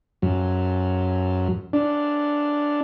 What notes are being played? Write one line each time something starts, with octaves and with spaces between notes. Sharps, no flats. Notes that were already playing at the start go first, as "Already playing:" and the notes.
F#2
D4